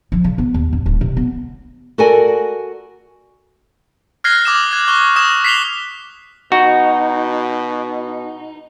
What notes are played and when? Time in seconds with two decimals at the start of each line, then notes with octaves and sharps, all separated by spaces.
0.12 F3
0.24 C#3
0.38 B3
0.54 D#2
0.73 F2
0.86 D1
1.01 C3
1.17 B3
1.98 F#4 A4 A#4 D5 G#5
4.24 F6 F#6 G#6 A#6 C7 G7
4.45 D6 D#6 E7
4.71 F#6 G#6
4.88 C#6 F#6 G7
5.16 D#6 G#6 A#6 E7
5.44 B6 C7 F7 G7
6.52 B2 D#4 F#4